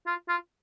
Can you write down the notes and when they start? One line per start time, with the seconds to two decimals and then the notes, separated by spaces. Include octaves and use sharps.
0.07 F4
0.29 F4